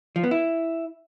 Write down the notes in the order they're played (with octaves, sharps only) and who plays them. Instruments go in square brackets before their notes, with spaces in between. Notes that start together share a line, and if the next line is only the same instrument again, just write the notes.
[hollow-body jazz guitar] F3
B3
E4